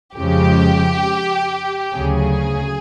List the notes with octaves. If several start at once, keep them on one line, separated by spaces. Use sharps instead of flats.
F2 C#3 F3 G#3 G4
D2 C#3 F#3 G#4